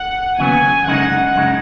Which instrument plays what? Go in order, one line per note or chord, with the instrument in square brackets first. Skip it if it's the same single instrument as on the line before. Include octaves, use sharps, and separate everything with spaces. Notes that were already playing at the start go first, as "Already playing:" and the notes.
Already playing: [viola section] F#5
[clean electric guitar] D#2 C#3 F#3 B3 [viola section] G#5
[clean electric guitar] F#2 C#3 G#3 D#4 [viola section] F#5
[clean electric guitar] F#2 C#3 G#3 D#4